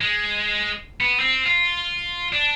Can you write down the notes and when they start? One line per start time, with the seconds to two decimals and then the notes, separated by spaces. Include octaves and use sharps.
0.01 G#3
1.01 B3
1.20 C4
1.46 F4
2.33 D4